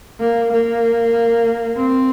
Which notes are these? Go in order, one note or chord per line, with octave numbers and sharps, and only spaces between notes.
A#3
A#3
C4